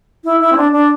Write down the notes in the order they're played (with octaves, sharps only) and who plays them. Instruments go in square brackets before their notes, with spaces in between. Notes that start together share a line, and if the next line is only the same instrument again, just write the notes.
[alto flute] E4
E4
C4
D4
D4